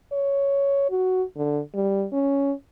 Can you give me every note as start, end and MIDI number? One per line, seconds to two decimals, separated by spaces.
0.12 0.90 73
0.91 1.23 66
1.36 1.60 50
1.75 2.06 55
2.12 2.52 61